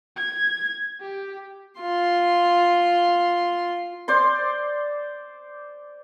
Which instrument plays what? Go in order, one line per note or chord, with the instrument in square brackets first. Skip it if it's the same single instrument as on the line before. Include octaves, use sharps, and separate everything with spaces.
[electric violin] G#6
G4
[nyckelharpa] F4 C6
[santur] C5 D5 C6